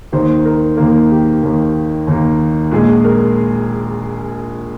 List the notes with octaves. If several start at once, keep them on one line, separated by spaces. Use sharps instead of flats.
D#2 D#3 A#3 C5
A#4
D#2 D#3 A#3 A#4
G4
D#2 D#3 A#3
D#2 D#3 A#3
A#1 A#2 G#3 G#4
A#4